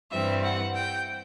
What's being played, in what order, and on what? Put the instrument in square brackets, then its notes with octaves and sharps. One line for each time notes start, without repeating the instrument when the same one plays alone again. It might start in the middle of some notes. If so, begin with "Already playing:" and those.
[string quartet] G2 E3 G3 C4 E5
F#5
G5